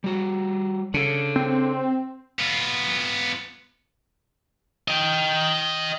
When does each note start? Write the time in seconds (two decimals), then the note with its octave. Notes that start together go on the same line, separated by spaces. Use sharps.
0.04 G3 F#4
0.94 C#3 D4 A4
1.36 C4
2.39 B3 F4
4.88 D#5 G5